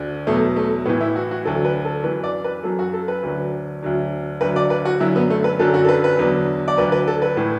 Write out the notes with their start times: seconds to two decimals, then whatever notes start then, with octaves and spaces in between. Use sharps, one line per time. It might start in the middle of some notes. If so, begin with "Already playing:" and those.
Already playing: D2 D3
0.27 E2 B2 F#3 A3
0.56 A3
0.85 A2 B3
0.89 E3
1.01 E4
1.16 F#4
1.31 F#4
1.45 D2 D3 F#3 A4
1.65 B4
1.85 A4
2.04 F#2 E3 B4
2.24 D5
2.44 B4
2.63 F#2 F#3 A4
2.79 F#4
2.93 A4
3.08 B4
3.23 D2 D3 F#3
3.83 D2 D3 F#3
4.41 D2 D3 F#3 B4
4.56 D5
4.70 B4
4.85 F#4
5.00 F#2 D3 F#3 E4
5.16 B3
5.30 A3
5.44 B4
5.59 F#2 D3 F#3 A4
5.74 F#4
5.85 A4
5.89 B4
6.04 B4
6.18 E2 D3 F#3
6.68 D5
6.77 D2 D3 F#3 B4
6.92 B4
7.07 A4
7.22 B4
7.37 A2 E3